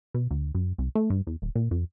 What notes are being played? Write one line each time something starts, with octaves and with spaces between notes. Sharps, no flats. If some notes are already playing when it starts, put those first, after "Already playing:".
B2
D2
F#2
C2
A3
G2
E2
D#1
A#2
F2